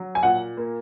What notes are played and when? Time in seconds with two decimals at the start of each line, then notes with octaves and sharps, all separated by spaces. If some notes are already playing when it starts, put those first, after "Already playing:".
Already playing: F#3
0.15 G#5
0.23 A#2 F#5
0.57 A#3